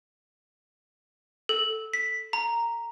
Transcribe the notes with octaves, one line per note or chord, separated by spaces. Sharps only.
A4
B6
A#5